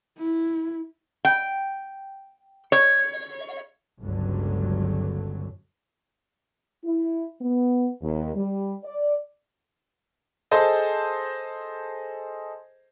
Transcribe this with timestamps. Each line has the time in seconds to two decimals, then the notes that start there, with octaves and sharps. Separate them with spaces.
0.18 E4
1.25 G5
2.72 C#5
4.00 G1 C#2 G2 D3 F#3
6.84 E4
7.41 B3
8.01 D#2
8.35 G3
8.84 D5
10.51 G#4 A4 C5 D#5 A5